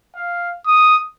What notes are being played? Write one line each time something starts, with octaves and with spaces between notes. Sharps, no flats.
F5
D#6